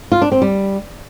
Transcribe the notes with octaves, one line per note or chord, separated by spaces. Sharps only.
F4
D4
C4
G3